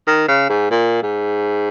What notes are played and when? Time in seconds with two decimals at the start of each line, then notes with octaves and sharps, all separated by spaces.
0.07 D#3
0.28 C#3
0.50 G#2
0.71 A#2
1.03 G#2